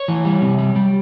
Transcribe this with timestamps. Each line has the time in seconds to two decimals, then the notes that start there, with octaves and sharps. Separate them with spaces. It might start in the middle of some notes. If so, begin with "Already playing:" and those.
Already playing: C#5
0.08 E3
0.25 G3
0.42 C3
0.59 G3
0.76 G3